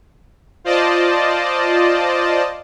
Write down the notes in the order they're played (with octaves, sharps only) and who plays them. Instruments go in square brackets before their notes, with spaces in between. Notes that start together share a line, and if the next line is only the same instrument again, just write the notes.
[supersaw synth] F4 C5 D5 D#5 A5